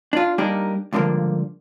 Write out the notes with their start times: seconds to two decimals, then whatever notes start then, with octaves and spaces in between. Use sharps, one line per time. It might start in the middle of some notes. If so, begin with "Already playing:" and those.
0.13 D4 F4
0.38 G3 A#3 D4 D#4 G4 A#4
0.92 C#2 G2 D3 F3 A#3